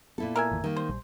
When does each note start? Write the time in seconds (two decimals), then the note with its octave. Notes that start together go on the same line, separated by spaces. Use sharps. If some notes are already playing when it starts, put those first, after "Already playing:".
0.18 A#2 B3 E4 A4
0.36 A#4 E5 G#5
0.51 A1 F2 D#3
0.64 D#3 G3 A#3
0.77 C5
0.89 A#1 G3